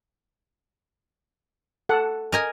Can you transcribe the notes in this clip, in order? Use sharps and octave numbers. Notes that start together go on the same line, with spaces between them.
A4 F#5
A#4 D#5 G#5